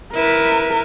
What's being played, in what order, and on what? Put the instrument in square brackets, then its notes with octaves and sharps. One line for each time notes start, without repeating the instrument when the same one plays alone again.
[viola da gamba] E4 B4 [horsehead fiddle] A#4